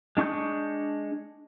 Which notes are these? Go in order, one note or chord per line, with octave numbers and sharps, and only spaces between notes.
G#3 D4 C#6 D#6 G6